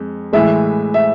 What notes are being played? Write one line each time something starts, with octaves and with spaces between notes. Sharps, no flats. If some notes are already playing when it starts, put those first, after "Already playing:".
Already playing: F2 G#3
A2 E3 G#3 E5
E5